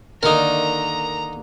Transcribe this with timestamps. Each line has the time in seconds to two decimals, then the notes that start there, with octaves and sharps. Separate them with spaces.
0.23 D3 D#3 A#3 D#4 A#4 A#5